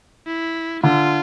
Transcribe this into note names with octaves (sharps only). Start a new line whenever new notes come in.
E4
D3 F4